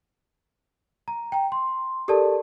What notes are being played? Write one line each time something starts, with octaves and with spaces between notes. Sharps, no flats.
A#5
G5 A#5
C6
G4 A4 A#4 D5 A5